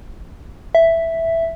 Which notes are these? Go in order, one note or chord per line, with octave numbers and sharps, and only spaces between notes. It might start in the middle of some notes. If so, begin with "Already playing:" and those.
E5